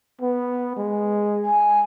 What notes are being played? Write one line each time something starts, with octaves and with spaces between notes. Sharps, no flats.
B3
G#3
G#5